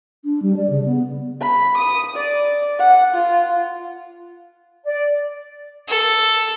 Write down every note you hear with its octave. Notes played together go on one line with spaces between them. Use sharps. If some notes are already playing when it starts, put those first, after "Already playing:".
D4
G3
D5
C#3
B3
B5
D#6
D5
F#5
F4
D5
A4